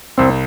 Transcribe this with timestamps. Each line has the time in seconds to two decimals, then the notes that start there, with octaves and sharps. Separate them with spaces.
0.18 C2 C4